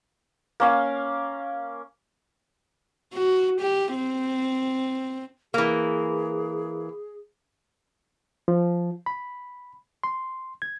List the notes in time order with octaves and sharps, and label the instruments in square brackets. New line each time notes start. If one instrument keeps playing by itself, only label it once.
[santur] A#3 C#4 F5
[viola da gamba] F#4
G4
C4
[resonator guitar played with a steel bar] E3 A#3 [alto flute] G#4
[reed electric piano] F3
B5
C6
G#6